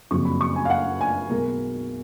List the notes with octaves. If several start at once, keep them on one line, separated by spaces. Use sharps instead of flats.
F#1 F2 C#3 F#3 C#6
B5
C#6
G#5
F5
F#5
G#5
B1 B2 G#3 A#4